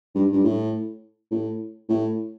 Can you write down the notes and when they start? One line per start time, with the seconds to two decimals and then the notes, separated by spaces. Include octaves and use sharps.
0.15 G2
0.33 G2
0.44 A2
1.31 A2
1.89 A2